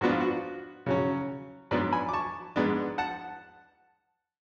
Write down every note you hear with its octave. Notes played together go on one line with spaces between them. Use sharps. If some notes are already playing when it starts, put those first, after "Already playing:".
G#2 F3 B3 D4 F#4
F4
F#4
C#3 F#3 C#4
G#2 F#3 B3 D4 B4 D5
G#5 B5
D6
A5 C#6
G#2 G#3 B3 D4
F#5 A5